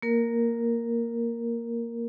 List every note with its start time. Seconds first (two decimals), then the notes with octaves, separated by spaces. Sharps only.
0.02 A#3 A#4